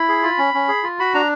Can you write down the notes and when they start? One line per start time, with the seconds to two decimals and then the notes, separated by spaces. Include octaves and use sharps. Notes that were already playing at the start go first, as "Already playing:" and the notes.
Already playing: E4 B5
0.08 G#4
0.23 F4
0.38 C#4
0.54 C#4
0.68 G#4
0.83 F4
0.99 F#4 B5
1.14 D4 A#5